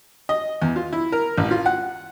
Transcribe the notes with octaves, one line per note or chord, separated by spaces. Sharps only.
D#5
E2
F4
E4
A#4
A1
F4
F#5